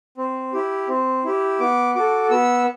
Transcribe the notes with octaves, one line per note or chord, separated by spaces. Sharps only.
C4
E4 G4
C4
E4 G4
B3 D6
F#4 A4 D6
B3 E6